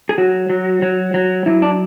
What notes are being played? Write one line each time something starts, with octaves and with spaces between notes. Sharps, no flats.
G#4
F#3 F#4
F#3
F#3
F#3
F#3 E4
D4